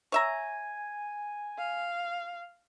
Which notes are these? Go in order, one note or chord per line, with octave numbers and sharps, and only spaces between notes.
C#5 E5 G#5 A#5
F5